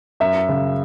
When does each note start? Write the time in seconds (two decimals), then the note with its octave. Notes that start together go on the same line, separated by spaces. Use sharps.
0.20 F#2 E5
0.49 C#3